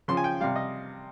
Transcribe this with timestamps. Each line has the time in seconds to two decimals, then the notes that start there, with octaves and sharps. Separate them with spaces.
0.08 C#3 F3 C6
0.17 G#5
0.24 G5
0.40 C3 G3 F5
0.56 D#5